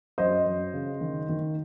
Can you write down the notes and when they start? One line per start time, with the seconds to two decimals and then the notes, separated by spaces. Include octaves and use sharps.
0.18 F#2 C5 D#5
0.46 F#2
0.74 C#3
1.01 D#3
1.29 D#3